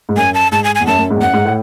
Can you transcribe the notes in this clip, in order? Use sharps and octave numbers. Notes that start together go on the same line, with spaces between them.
G#2
F#2 G#5
A5
G#2 A5
G#5
E2 G#5
F#2 A5
F#2
G#2
E2
F#2 F#5
G#2
A2